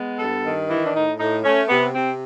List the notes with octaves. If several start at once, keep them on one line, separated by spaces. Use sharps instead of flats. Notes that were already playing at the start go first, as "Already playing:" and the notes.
Already playing: G#3 B3
G2 A4
D#3
E3 E4
D4
A2 D#4
A2 D#4
A3 C#4
C3 B3
C3 C4